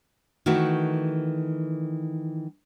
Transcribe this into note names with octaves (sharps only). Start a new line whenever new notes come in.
D#3 E3 A3 F#4